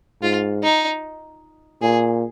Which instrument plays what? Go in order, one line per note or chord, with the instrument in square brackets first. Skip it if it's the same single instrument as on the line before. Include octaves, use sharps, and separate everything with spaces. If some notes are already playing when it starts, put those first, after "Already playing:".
[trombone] G#2 [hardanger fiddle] F4
[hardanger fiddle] D#4
[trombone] A#2 [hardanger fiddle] G#4